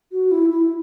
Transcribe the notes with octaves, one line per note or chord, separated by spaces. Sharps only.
F#4
E4
E4